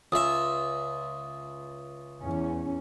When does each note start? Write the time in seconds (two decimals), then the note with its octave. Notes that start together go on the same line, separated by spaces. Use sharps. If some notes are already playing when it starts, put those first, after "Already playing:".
0.12 C#2 E5 D#6
2.21 E2 C#4